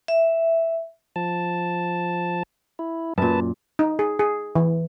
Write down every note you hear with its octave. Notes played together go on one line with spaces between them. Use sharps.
E5
F3 A5
E4
F#2 A#2 B4 A5
D#4
G#4
G#4
E3